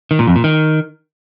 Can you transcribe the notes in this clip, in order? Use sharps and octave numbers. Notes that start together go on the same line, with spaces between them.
D#3
A#2
F2
A#2
D#3